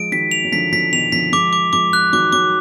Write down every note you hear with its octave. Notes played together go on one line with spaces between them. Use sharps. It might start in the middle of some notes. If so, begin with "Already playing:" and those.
Already playing: F3 G#3 D7
D#3 F#3 B6
F7
F#3
D3 F3 B6
D3 F3 B6
B2 D#3 F7
D3 F3 B6
F3 G#3 D6
D6
F3 G#3 D6
F#6
D#3 F#3 D6
D#3 F#3 D6